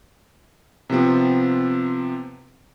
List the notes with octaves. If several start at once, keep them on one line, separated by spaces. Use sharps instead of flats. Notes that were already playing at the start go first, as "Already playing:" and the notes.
C3 F3 B3 C4